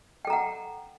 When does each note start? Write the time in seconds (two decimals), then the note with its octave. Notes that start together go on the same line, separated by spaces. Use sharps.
0.25 G5
0.27 A4
0.30 A#5
0.33 F#5